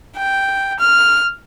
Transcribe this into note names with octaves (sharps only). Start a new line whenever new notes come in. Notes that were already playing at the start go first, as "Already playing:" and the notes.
G5
F6